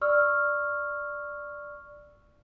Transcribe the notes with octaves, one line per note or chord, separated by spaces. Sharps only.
D5 C#6 E6 F6